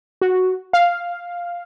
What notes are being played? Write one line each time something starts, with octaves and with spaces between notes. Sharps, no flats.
F#4
F5